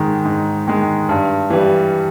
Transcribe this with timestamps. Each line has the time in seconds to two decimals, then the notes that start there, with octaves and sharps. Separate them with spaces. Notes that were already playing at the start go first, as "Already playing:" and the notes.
Already playing: G#2 D#3 G#3
0.25 G#2
0.68 D#3 G#3
1.09 G2
1.50 E3 G3